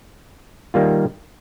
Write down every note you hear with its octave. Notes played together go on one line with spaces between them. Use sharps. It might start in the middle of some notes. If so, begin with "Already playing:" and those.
D#3 G3 A#3 F4